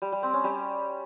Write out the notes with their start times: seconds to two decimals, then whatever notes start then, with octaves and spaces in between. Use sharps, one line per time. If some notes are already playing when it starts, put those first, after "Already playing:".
0.02 G3
0.12 G3
0.23 C4
0.33 C#4
0.44 G3